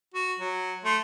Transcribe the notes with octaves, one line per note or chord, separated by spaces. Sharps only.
F#4
F#3
A3 C6